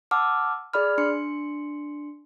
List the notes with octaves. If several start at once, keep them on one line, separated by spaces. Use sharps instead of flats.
F#5 A5 D6 E6 F6
G#4 D5 B5 F6
D4 C6 C#7